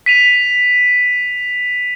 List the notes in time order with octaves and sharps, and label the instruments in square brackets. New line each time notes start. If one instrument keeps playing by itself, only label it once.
[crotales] B6 D#7 F7